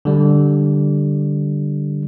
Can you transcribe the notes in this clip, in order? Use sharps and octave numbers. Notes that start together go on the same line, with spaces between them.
D3 G3